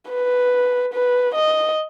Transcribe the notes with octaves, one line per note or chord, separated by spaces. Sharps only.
B4
B4
D#5